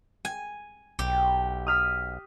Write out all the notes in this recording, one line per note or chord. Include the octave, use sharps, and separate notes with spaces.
G#5
B1 G4
D#6 F6 B6